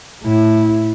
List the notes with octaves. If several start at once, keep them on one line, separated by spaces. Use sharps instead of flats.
A2 E4